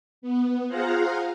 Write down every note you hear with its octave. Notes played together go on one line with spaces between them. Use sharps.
B3
F4 G#4 C5 F5 F#5 A#5